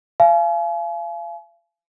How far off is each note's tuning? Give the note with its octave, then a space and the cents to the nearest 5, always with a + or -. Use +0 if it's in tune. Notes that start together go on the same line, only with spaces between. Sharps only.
F5 -35 G#5 +40